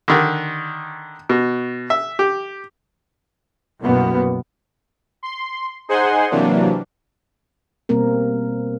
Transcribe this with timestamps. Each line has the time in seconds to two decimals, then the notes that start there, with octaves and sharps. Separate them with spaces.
0.08 D3 D#3
1.29 B2
1.90 E5
2.19 G4
3.81 C2 F#2 B2 A#3 B3
5.23 C6
5.89 D#4 G#4 C5 F#5 G#5 C6
6.31 C3 E3 F#3 A#3 D4
7.89 B2 G3 A#3 C4 A#4